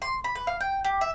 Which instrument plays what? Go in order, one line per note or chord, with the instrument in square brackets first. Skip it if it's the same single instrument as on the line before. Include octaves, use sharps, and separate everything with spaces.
[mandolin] C6
B5
B4
F5
G5
G4
E5